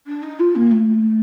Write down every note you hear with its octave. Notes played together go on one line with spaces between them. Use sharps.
D4
D#4
F4
A#3
A3